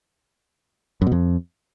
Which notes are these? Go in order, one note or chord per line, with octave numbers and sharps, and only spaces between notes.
F#2
B2
F2